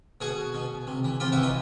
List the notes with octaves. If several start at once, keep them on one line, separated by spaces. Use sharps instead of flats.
B2 F#4 G#4
B2
C3
E3
C3 F4 G4
E4 F#4
E3
D#4 F4